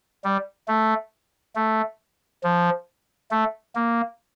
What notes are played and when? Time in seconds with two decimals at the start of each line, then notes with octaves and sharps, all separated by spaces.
0.24 G3
0.68 A3
1.56 A3
2.44 F3
3.31 A3
3.75 A#3